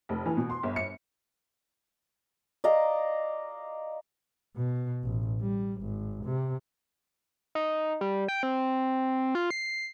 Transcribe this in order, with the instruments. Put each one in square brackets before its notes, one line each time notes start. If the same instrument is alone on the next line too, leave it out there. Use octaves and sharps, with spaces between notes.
[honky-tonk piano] F1
E3
B2
C6
G1
C#7
[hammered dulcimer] D5 D#5 F5 A#5
[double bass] B2
A1
G3
G#1
C3
[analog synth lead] D#4
G3
G5
C4
F4
C7